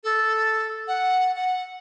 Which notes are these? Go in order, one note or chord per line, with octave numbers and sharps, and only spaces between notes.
A4
F#5
F#5